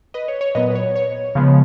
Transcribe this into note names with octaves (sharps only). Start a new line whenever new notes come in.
B4 D#5
C#5
C#5
A#2 F#3 B3 B4 D#5
B4
C#5
C#5
C#3 F3 G#3 B3